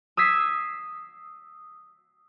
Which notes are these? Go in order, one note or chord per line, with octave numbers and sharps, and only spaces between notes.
D#6 E6 G#6 B6 C7